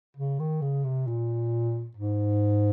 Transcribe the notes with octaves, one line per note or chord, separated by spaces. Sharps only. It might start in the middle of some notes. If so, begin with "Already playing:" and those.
C#3
D#3
C#3
C3
A#2
G#2